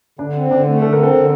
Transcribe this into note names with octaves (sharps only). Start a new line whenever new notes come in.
D3 D4
C4
D3 D4
A3
D3 A4
A#4
C4
A4
D3